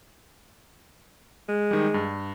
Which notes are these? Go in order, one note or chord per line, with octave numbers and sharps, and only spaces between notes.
G#3
D#3 G3
G2